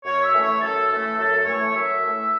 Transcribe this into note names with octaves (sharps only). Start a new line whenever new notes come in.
F#2 C#5
E5
E3 A3
C#5
F#2 A4
E3 A3 A4
F#2 A4
E3 A3 C#5
F#2 E5
E3 A3